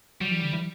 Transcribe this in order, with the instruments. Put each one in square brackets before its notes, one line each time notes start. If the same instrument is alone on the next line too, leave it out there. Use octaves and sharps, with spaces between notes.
[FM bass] F#3 [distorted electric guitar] G3
[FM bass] E3
D3
E3